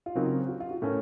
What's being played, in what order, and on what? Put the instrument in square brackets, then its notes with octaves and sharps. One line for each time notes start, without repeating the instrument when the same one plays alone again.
[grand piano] F4
[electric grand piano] C#3 F#3 C4 F#4 A#4 [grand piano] D#4
[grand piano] F#4
F4
F#4
[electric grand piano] A2 A3 C#4 [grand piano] A#4